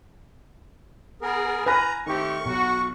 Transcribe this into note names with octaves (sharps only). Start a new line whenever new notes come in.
B3 G#4 A#4
B4 G#5 A#5 F6 A#6
D#3 A3 C4 G4 C#6
B1 F#4